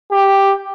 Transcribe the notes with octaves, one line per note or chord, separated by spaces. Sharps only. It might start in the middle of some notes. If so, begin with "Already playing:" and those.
G4